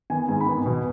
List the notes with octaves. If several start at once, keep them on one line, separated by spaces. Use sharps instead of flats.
D#3 B3 G#5
G#2 G#5
B5
D#3 B3
B2